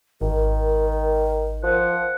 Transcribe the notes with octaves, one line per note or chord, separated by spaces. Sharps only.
G#1 D#3 A#4
F3 F#5